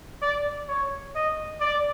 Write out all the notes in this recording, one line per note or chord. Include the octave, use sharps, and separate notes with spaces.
D5
C#5
D#5
D5